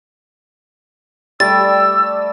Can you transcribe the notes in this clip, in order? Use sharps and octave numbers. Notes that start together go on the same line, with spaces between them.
G3 A3 D5 E6 A6